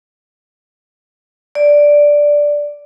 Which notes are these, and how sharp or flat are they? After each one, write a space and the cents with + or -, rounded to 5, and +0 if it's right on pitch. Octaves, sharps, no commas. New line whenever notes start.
D5 +0